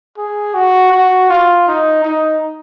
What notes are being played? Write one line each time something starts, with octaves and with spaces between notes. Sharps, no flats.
G#4
F#4
F#4
F4
D#4
D#4